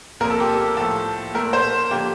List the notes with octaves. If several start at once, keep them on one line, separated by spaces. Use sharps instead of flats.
C2 A#2 F3 A#3 A#4
A4
G4
A4
A2 F3 A3 A4
A#2 A3 A#4
C5
D3 F3 A#3 G4